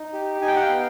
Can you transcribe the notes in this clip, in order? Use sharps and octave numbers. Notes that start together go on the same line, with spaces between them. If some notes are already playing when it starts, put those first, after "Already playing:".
Already playing: D#4
G4
D#4 G#5
G5
F#5
F5 G5
B3